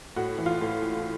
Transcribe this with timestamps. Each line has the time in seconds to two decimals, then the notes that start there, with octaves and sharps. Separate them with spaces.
0.16 A2 F#4
0.38 E3
0.46 F4
0.61 A2